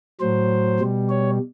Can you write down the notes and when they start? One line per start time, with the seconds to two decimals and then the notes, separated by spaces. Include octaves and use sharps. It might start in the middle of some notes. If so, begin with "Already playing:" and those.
0.21 A2 F#3 C5
0.80 B2 G3
1.10 C#5